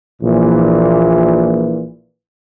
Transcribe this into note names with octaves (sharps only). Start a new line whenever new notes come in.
A#1 A#2 E3